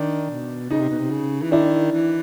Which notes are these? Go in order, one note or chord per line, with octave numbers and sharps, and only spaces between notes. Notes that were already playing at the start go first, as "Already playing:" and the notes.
Already playing: D#3 D4
B2
C#3 D#4
C3
B2
C3
C#3
E3
D#3 D4 E4
E3